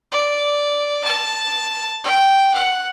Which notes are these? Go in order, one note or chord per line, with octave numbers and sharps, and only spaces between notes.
D5
A5
G5
F#5